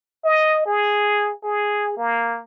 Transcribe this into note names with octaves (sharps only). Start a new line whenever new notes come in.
D#5
G#4
G#4
A#3